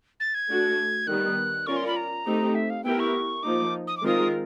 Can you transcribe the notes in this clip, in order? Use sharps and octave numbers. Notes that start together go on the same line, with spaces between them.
A6
G#6
A3 D4 F#4
D#3 G3 B3 F#6
C#4 F4 A#4 D5 C#6
C6
B5
A#5
A3 C4 D#4 G4
E5
F5
B3 E4 G4 A#4 G5
C#6
F3 A#3 D#4 D6
D#6
D6
D#3 G#3 C4 F4 A#4 D#6